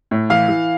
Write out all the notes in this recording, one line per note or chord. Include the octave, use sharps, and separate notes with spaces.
A2
E3 F5
E3